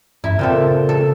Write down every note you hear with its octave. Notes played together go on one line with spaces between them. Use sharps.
G2 E4
A#2 C#3 C4 A4
A4